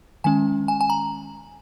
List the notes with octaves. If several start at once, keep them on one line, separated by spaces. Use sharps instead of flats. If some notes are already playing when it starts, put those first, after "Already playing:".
D#3 G#3 C#4 G#5
G#5
G#5
A#5